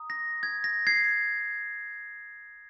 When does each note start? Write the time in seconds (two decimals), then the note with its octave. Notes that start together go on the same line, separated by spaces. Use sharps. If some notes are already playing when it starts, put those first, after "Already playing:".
Already playing: A#5 D#6
0.10 A#6
0.43 G#6
0.64 A#6
0.87 G#6 C7